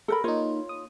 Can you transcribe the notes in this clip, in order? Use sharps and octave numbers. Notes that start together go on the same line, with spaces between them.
A4 A#4 B5
A#3 D#4 F4 C#5
D#6